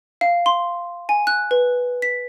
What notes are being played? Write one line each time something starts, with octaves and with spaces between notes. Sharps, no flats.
F5
C6
G#5
F#6
B4
B6